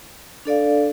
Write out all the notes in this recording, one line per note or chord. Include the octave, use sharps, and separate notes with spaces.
D4 A4 D5 F5